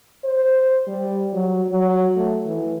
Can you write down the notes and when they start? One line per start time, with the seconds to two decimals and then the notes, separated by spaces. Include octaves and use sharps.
0.25 C5
0.87 G3
1.33 F#3
1.70 F#3
2.16 A3
2.46 E3